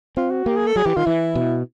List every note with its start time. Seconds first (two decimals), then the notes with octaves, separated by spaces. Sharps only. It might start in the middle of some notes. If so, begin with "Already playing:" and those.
0.17 C4 F4
0.31 F#4
0.46 A#3 G4
0.57 G#4
0.66 A4
0.76 F#3 G#4
0.86 E3 G4
0.97 D#3 F4
1.06 E3 E4
1.35 B2